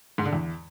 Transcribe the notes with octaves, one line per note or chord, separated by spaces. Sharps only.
G#2
D3
E2